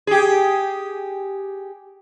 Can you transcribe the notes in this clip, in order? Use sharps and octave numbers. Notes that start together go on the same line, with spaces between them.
G4 G#4